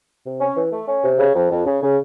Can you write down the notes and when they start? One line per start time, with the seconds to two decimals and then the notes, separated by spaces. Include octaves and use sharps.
0.25 C3
0.39 C#4
0.56 E3
0.72 A3
0.87 C#4
1.03 C3
1.18 C#3
1.35 F2
1.51 F2
1.66 C#3
1.82 C#3